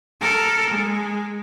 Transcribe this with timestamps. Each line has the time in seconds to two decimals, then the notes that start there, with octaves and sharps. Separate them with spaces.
0.21 A4 A#4
0.70 G#3